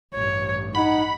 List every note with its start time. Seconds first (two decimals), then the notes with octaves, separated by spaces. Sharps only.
0.14 A1 G2 C#5
0.75 D#4 F#5 B5